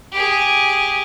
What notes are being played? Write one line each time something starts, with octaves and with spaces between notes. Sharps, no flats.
G4 G#4